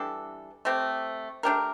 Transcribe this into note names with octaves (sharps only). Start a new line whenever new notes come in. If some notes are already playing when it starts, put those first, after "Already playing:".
Already playing: E3 G3 D4 A4
A3 C4 G4
A3 D4 G4 A#4